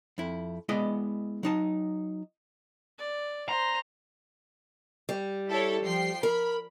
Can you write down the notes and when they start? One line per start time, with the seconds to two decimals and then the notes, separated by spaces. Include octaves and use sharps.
0.18 F2 E4
0.69 G#3 B3 E4 D5 D#5
1.43 F#3 D#4 A5
2.98 D5
3.49 C5 A#5
5.09 G3
5.48 E4 A4 C#5
5.81 F3 G5 C7
6.23 A#4 B5